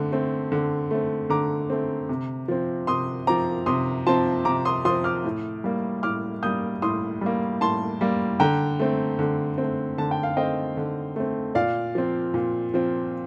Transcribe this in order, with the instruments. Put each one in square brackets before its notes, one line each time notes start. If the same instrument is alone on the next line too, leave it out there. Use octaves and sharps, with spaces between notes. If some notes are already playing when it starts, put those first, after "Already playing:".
Already playing: [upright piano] D3 A3 C4
A3 C4
D3
A3 C4
D3 A#5 D6
A3 C4
C3
F3 C4
C3 C6 D#6
F3 C4 A#5 D6
C3 C6 D#6
F3 C4 A5 C6
C3 A#5 D6
C6 D#6
F3 C4 C6 D#6
D6 F6
A2
G3 A#3
A2 D6 F6
G3 A#3 D#6 G6
A2 C6 D#6
G3 A#3
A2 A5 C6
G3 A#3
D3 G5 A#5
A3 C4
D3
A3 C4
D3 A5
G5
F5
A3 C4 D#5 G5
D3
A3 C4
A#2 D5 F5
F3 C4
A#2
F3 C4